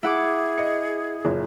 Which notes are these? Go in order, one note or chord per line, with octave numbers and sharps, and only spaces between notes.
E4 G#4 F#5 D6
D#5 C#7
F#1 A#2